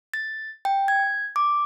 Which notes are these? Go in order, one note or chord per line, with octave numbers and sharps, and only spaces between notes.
A6
G5
G#6
D6